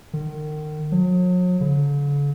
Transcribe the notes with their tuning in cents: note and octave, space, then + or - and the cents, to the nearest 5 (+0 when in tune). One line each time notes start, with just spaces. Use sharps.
D#3 -35
F#3 -40
D3 -45